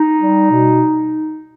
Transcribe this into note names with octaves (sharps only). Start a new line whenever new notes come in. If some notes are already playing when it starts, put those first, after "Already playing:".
Already playing: D#4
G3
B2